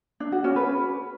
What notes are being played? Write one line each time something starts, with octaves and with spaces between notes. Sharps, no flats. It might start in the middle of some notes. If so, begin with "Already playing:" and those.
D4
F#4
C#4
B4